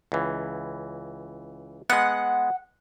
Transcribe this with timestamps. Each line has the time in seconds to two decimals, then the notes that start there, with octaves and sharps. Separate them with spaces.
0.12 C#2 E3
1.90 G#3 B3 F#5